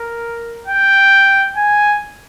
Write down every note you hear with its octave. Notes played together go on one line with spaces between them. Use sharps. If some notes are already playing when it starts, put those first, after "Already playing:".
Already playing: A#4
G5
G#5